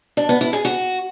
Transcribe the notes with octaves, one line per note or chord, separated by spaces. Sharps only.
D4
B3
E4
G#4
F#4